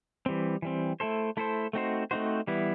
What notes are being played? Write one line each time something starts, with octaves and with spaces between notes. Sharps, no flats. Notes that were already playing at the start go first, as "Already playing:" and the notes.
E3 G3 C4
E3 G3 C4
A3 E4 A4 C5
A3 E4 A4 C5
A3 C4 D#4 F#4 C5
A3 C4 D#4 F#4 C5
E3 G3 B3 E4